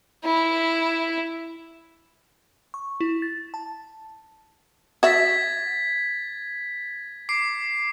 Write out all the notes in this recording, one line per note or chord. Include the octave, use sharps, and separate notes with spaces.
E4
C#6
E4
A6
A5
F#4 E5 G#6 A6 B6
D6 C7 D7